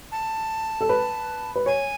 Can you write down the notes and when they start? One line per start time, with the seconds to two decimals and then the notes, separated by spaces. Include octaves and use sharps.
0.12 A5
0.81 A4
0.89 B4
1.56 B4
1.66 C#5 G#5